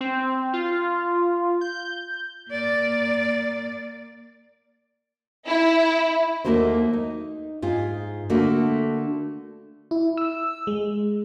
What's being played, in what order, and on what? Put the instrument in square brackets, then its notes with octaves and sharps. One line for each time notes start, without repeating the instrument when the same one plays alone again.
[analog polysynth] C4
F4
G6
[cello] A#3 D5
[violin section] E4
[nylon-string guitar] D#2 D3 A3 A#3 F#4 C5
D#4
G#2 F4 G#4
D3 A3 A#3 F#4
[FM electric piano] E4
E6
G#3